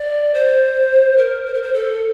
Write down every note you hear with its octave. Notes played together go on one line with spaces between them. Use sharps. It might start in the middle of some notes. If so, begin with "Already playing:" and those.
Already playing: D5
C5
A#4
C5
A#4
C5
A4